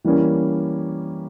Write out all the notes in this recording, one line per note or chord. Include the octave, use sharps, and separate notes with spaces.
E3 G3 A#3 C#4